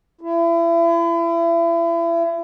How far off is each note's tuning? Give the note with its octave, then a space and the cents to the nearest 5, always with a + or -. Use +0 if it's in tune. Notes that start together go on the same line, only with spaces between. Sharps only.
E4 +35